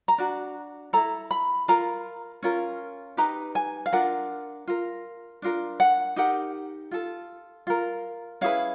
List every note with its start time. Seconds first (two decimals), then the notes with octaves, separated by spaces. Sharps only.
0.08 A#5
0.18 D4 F#4
0.93 E4 A4 A#5
1.31 B5
1.68 F4 A#4 A#5
2.42 C#4 F4 A#4
3.17 D#4 G4 B4 A#5
3.55 G#5
3.86 F5
3.92 D4 F4 A#4 F#5
4.67 F4 A#4
5.42 D4 F4 A#4
5.80 F#5
6.16 D#4 G4 A#4 F#5
6.91 F4 A4
7.67 F4 A#4
8.41 C#4 E4 G#4 B4 F5